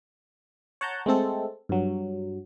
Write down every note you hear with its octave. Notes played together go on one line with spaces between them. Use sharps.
C#5 F#5 A5 A#5 G6
G#3 A3 C4 A4
G2 F#3